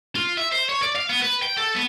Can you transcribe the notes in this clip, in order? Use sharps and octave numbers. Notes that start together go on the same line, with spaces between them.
F4
E5
C5
C#5
D5
F5
B3
B4
G5
A4
B3